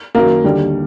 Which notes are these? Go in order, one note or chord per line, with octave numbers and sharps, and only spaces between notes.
F#2 D#3 F#3 A#3
D#2 D3 G3